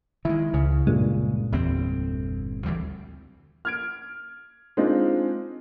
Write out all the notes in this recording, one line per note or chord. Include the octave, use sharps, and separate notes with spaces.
D#3 G#3 E4
C#2 C#3
G2 A#2 G#3
G1 E2 C4
D2 E3 G3
F6 G#6 D7
G#3 C4 D4 D#4 F4